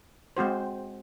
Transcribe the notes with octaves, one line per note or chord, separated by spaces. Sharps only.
G#3 C4 F#4 C5